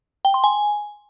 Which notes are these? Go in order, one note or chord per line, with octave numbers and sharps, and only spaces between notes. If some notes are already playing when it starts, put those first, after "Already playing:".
G5
C6
G#5